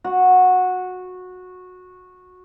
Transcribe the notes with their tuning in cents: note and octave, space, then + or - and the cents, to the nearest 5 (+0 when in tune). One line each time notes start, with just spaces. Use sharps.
F#4 -15